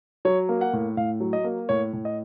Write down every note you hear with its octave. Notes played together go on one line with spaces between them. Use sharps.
F#3 C#5
A#3
F#5
A2
A2 F5
F#3
D#5
A#3
A2 C#5
A2
D#5